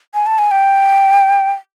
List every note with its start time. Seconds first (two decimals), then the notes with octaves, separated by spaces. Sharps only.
0.14 G#5
0.26 A5
0.39 G#5
0.51 G5